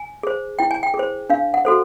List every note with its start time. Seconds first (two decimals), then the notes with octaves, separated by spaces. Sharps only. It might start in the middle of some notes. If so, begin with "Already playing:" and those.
Already playing: G#5
0.23 G#4 C5
0.59 E4 G5
0.71 G#5
0.83 G5
0.94 G#4
0.99 C5
1.30 D4 F5
1.54 F#5
1.65 F#4 A4 C5